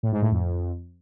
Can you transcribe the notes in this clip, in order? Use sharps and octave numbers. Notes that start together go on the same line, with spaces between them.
A2
G#2
A2
F2